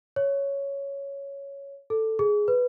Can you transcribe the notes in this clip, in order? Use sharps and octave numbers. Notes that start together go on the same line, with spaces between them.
C#5
A4
G#4
B4